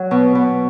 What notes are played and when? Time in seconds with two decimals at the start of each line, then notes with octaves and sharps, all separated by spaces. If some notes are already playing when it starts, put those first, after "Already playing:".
Already playing: F#3
0.11 B2
0.35 B2